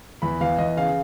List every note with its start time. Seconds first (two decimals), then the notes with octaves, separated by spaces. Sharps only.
0.22 E2 B5
0.41 E2 F5
0.58 E2 D#5
0.77 C#3 F5